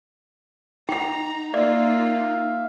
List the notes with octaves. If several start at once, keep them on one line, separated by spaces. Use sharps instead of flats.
D#4 F#5 G5 A#5
A#3 F4 D5 E5 F5